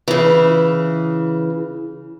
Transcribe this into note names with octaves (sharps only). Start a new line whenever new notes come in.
C#3 E3